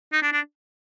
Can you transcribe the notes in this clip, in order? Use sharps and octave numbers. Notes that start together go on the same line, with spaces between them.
D#4
D4
D4